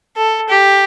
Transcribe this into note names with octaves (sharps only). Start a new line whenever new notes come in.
A4
G4